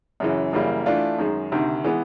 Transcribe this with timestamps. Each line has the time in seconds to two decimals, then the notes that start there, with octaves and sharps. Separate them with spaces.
0.20 F#2 C#3 E3
0.53 F#2 C#3 E3 G3 A#3
0.86 E3 A3 D4 F4
1.19 F#2 D#3 G#3
1.52 D2 C3 D#3
1.84 E3 G#3 B3